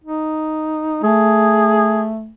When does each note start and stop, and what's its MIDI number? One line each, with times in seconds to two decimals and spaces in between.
0.04 1.01 63
1.03 2.32 57
1.03 2.10 68